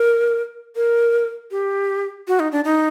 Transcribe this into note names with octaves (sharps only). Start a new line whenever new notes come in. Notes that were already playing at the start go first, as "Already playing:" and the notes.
Already playing: A#4
A#4
G4
F#4
D#4
D4
D#4